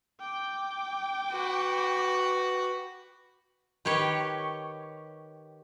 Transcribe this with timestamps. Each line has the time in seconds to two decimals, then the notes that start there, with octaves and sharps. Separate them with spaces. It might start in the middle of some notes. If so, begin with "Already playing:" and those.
0.20 G5 D6
1.31 F#4 B4
3.85 D#3 G4 B4 C#5